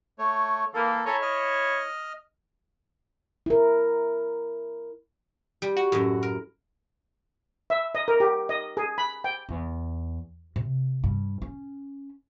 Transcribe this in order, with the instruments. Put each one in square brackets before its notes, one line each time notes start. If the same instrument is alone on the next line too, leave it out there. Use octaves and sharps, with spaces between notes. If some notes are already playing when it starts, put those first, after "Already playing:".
[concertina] A3 C#5
[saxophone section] E3 A#3 [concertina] A4
[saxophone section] E4 C#5 [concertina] A4 G#5 A#5
[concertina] D#5 F6
[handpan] E4 A#4
[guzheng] G3
[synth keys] F#4
[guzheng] F#2 A2
A#4
[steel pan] E5
D#5
A#4
G4
D#5
G#4
B5
G5
[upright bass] E2
C3
G2
C#4